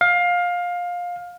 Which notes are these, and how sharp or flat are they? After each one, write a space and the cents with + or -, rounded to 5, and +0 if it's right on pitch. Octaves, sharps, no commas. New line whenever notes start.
F5 +20